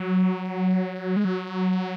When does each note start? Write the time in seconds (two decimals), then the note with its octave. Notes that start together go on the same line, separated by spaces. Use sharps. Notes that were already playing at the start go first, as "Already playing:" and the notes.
Already playing: F#3
1.16 G#3
1.25 F#3